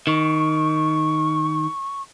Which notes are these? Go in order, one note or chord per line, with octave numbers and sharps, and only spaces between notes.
D#3 C#6